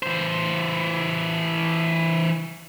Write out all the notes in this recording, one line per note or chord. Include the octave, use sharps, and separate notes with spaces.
E3 C5